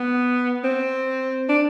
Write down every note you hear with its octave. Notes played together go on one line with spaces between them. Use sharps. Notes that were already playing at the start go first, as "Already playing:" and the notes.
Already playing: B3
C4
D4